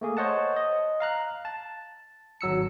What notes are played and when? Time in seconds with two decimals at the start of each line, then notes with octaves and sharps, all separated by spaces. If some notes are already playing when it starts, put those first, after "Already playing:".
0.01 A3 A#3 G#4
0.17 C5 C#5 D#5 F#5 A5
0.56 D#5
1.00 F5 A#5 F#6
1.45 A5
2.41 G#1 F#3 E6 C#7